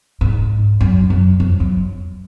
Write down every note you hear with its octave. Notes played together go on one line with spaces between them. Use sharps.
G#2
F#2
F#2
F2
F#2